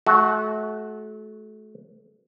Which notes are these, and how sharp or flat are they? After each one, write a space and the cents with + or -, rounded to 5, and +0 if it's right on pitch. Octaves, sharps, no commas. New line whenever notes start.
A3 -35 F#4 +0